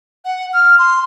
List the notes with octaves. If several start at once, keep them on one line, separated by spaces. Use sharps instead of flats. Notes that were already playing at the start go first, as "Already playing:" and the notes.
F#5
F6
C6